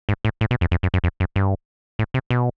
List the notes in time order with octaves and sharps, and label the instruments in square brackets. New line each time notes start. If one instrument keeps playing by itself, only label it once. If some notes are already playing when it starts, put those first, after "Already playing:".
[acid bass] G#2
A2
A2
B2
F2
F2
F#2
F#2
F2
F#2
G2
A2
C3
B2